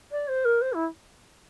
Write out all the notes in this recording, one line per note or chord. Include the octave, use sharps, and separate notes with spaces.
D5
C5
A#4
C5
E4